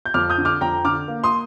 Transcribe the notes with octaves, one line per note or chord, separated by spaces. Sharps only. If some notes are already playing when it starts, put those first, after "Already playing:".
G6
F2 D6 F6
D#6 G6
D3
D6 F6
F2 G5 A#5
D3 D6 F6
A#3
C6 D#6